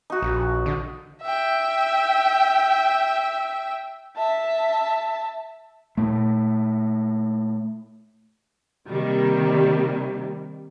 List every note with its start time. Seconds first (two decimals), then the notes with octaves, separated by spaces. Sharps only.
0.10 D#4 F#4
0.22 A#1
0.66 D3
1.22 E5 G5
4.16 E5 A5
5.97 A#2 A3
8.89 C3 D#3 G3 A#3